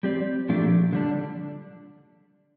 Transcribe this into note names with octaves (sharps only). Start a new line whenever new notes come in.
G3 C4 G4 D5
A#2 F3 A3 D4 G4
D3 G3 D4